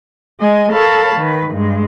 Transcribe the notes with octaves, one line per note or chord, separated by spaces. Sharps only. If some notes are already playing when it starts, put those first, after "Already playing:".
G#3 D#5 G#5
A4 A#4 C#5 F5 A5 B5
D#3 B4
G2 G#3